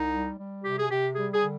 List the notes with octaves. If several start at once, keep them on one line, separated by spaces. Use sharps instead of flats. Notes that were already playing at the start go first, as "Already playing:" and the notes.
Already playing: C2 D#4
G3
G3
C3 G4
G#4
C3 G4
G3 G#4
G#4
D3